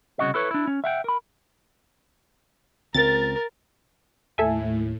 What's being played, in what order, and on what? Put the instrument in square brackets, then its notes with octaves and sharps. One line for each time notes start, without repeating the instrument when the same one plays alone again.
[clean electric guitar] C2 C#3 F#4 D#5
E4 A4 B4 C#5
D4 E4
C#4
E5 F#5 G5
A#4 B5
[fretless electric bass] C#2 C4 [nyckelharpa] A#4 [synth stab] A6
[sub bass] D#2 [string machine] A2 [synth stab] A4 E5 G#5